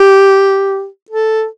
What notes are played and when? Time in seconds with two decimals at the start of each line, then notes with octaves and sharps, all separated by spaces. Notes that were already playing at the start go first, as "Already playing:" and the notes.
Already playing: G4
1.11 A4